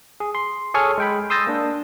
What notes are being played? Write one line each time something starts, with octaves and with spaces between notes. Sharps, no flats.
G#4
C6
G#4 A4 C#5 G#5 C#6 F6
G#3 G5 B5
C6 D#6 E6 G6 A6 A#6
A#3 D4